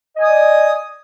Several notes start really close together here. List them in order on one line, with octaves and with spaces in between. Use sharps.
D#5 G#5 D#6 D5